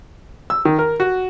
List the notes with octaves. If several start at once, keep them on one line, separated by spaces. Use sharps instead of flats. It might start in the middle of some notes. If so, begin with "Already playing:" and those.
E6
D#3
A#4
F#4